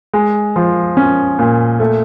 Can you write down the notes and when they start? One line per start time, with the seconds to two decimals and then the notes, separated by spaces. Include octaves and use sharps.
0.13 G#3
0.56 F3
0.97 C#4
1.39 A#2
1.80 A3